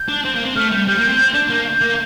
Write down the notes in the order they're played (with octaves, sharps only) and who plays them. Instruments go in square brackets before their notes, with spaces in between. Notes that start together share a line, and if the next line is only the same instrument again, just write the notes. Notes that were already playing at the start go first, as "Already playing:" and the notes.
Already playing: [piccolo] G6
[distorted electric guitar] D4
C4
A#3
C4
[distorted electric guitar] A3 [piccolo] F6
[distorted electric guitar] G3 [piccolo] G6
[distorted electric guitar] G3 [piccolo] G6
[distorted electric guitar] A#3
C4
C4
D4
[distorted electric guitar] A#3 [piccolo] G6
[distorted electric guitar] A#3